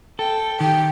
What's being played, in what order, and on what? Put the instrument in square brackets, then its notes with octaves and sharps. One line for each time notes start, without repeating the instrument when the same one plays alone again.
[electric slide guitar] A4 [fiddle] G5
[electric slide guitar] D#3 [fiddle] G4 [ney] G5